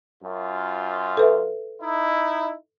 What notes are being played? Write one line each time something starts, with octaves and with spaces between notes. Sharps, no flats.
F#2 F4
A4 B4 E5
D#4 E4